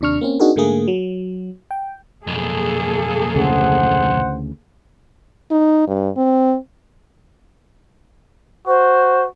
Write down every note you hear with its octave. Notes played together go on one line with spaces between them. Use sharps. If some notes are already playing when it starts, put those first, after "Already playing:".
D#2 C3 D4 C#6 F6
A#3 C4 C#4
C4 D4 D#4 F#4 G#4 A#4
G#2 D3 A3 A#3 G#4
F#3
G5
B1 F2 A#3 G#4 A4
D2 C#3 E3 C5 F#5
D#4
G2
C4
F#4 C5